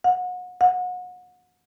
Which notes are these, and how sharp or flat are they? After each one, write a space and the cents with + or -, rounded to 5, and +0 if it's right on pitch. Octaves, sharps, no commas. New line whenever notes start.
F#5 -35
F#5 -35